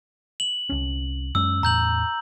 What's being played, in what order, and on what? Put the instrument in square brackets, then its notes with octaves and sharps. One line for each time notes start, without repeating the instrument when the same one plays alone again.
[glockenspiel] F#7
[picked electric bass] C2 C#4
[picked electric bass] F#2 G#3 C#4 [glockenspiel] E6
[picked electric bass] E2 A2 [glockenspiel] A#5 G6 F#7